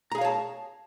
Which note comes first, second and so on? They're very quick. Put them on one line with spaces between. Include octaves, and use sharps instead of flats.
A#5 G#4 F5 C#5 A5